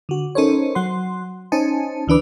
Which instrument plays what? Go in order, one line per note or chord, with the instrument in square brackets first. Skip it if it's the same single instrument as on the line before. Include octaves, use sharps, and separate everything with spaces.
[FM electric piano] D3 F#4
C#4 D#4 A4 A#4 C5 C#5
F#3 F#5 C6
C#4 D#4 C5 D#5 G#5 A5
D2 E3 D4 B4 D6